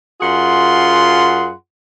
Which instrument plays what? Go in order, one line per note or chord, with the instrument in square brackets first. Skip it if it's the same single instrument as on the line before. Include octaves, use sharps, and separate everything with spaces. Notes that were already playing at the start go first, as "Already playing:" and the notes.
[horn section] F#2 F4 G#4 F#5 C6